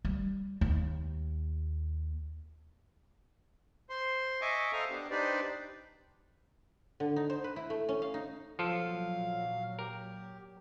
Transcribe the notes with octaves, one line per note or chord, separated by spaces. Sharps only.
G3
D#2
C5 C6
D#5 E5 G#5 C#6 D6
A4 C5 D#5 F5 A#5
B3 D4 G4
D4 D#4 G4 B4 C5 D5
D3
D#4
C5
B4
E4
A3
C#4
F5
D#4
A#2 F3 F#3 F4 A4 F5
G4 A#4